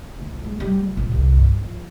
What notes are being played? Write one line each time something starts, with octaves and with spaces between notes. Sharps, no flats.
D2
F2
G#3
G3
F3
A#1
C2
G2
F3